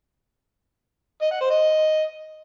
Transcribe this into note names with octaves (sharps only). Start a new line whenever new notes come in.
D#5
F#5
C5
D#5